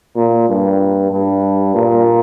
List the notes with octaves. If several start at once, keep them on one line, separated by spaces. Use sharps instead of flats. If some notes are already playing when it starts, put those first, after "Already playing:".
A#2
G2
G2
A#2